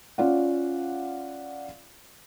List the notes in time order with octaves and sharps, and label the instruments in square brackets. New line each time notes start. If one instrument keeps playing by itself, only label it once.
[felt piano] C#4 F4 D5 F5 F#5